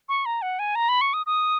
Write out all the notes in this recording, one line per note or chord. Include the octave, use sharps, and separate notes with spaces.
C#6
A#5
F#5
G#5
A#5
B5
C#6
D#6
D#6